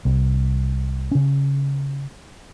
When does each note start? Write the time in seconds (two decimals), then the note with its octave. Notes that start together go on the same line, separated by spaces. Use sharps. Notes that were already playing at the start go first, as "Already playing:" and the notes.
0.05 C2
1.11 C#3 C#4